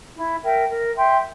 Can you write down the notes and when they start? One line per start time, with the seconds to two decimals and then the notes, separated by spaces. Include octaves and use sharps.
0.15 E4
0.42 A#4 E5 G5
0.69 A#4
0.95 E5 G5 C6